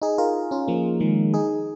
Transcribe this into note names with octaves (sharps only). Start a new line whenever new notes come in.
D#4 G#4
F4 A#4
C#4 F4
F3 A#3
D#3 G#3
D#4 G#4